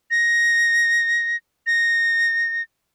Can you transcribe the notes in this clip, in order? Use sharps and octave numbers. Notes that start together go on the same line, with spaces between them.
A#6
A#6